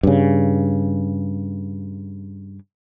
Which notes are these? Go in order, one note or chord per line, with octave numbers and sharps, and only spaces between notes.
G2 C#3